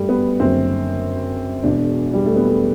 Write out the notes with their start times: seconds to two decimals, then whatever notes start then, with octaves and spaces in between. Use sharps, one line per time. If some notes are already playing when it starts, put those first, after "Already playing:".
Already playing: G1 F#2 D3 G3 A3
0.09 B3
0.40 F#1 F#2 D3 C4
1.63 E1 E2 B2 D4
2.13 G3
2.26 A3
2.36 B3
2.47 A3